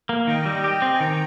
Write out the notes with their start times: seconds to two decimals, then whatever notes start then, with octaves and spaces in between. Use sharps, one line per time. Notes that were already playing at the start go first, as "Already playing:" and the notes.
0.09 A#3
0.27 D#3 D#5 G5
0.46 G3
0.64 G4
0.82 C4
0.94 G#5
1.00 D#3 G5 A#5